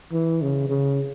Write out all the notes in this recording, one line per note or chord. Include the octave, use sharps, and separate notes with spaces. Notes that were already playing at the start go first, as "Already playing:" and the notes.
E3
C#3
C#3